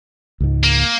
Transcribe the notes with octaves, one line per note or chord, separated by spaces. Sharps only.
C#2 G#2
A#3